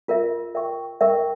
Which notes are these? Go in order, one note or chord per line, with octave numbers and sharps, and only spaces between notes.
F4 A#4 E5
A#4 E5 G5 C#6
A#4 E5 G5 C#6